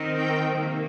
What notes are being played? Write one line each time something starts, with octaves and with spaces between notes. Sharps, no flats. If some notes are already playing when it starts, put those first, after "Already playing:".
Already playing: D#3 C4
G5
C3 D#3 A#3